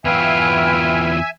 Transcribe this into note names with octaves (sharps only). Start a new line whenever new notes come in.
E2 F4 B4 E5 G5 G#5 F6